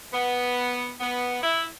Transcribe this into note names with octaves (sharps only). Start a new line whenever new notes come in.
B3
B3
E4